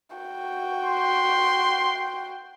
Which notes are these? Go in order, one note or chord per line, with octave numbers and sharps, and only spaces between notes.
F#4 G5
C6